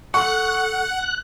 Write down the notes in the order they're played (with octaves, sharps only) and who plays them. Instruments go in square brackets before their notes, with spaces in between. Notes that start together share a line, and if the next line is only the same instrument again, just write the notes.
[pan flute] A4 [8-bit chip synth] F#5 [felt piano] C#6 [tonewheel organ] F#6